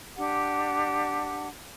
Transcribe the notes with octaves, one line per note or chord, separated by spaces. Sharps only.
D4 G4 F#5